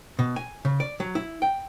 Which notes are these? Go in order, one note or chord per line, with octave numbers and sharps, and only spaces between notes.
B2
G#5
C#3
D5
F#3
E4
G5